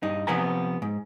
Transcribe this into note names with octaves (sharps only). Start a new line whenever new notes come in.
G2 D#4
C3 F3 B3 B4 G#5 A#5
G#2